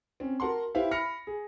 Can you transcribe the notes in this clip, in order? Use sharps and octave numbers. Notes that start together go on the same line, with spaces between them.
C4 C#4
F#4 A#4 F#5 A5 C6
E4 G4 B4 C5 E5 F5
B5 F6 A#6 C#7
G#4